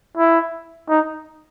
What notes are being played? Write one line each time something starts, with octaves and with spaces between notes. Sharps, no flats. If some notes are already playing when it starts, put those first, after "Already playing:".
E4
D#4